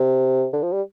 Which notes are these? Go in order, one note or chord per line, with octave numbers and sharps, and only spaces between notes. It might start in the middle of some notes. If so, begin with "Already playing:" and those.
Already playing: C3
D3
F3
G3